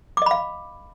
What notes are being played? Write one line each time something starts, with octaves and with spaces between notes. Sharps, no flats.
D#5 F5 B5 D6